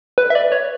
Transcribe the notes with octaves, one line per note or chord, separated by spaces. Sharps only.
B4
E5
D5
C#5